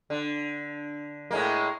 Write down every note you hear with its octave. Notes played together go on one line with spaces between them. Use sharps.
D3
A2 G#3 A#3